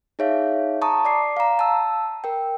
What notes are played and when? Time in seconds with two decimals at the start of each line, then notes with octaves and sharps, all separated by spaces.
0.19 D#4 G#4 C#5 E5 F5
0.82 A5 A#5 C#6 D#6
1.05 D5 D6 C7
1.37 F5 A#5
1.59 A5 E6
2.24 A#4 G5